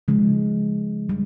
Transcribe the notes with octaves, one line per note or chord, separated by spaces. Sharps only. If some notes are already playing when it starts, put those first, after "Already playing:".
C#3 F3 G#3
G3